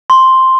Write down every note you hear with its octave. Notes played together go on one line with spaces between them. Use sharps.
C6